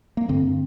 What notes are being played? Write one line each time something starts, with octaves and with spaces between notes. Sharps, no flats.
A#3
G2 D3 C4